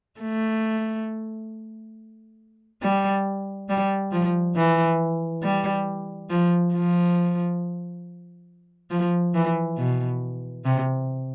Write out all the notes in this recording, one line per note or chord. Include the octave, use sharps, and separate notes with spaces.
A3
G3
G3
F3
E3
G3
F3
F3
F3
E3
B2
C3